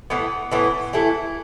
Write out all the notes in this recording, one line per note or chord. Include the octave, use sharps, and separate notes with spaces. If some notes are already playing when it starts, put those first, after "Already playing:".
A2 E3 B3
A2 E3 B3
E3 A3 E4 A4